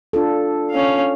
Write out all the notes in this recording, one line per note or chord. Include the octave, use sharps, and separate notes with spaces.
D4 F4 A4
C#4 F5